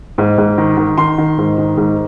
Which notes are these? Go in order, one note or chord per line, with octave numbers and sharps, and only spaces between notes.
G#2
G#2
D#3
D#3
D#3 C6
D#3
G#2
D#3
G#2